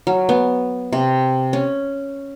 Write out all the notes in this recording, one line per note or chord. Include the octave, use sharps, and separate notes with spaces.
F#3
B3
C3
C#4